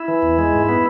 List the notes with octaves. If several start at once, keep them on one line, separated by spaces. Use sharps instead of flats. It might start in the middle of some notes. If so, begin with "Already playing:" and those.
Already playing: E4
E3
E2
G#3
G#2
B3